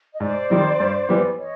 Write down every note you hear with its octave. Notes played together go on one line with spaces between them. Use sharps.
D#5
G#2 C5 D5
D#3 G3 C4
G2
E3 G3 B3
C#5 D#5